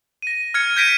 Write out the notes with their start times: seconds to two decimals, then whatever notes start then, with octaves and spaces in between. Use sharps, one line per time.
0.22 A#6 D#7
0.54 F6 G#6 C#7
0.77 G6 G#6 A#6 B6 D7 D#7